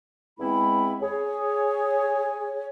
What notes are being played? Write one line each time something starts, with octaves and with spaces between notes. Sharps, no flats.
E2 G#3 C4 E4 B5
G#4 C#5